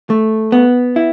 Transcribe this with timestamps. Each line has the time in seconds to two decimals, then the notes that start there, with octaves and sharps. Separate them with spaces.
0.10 A3
0.52 B3
0.96 E4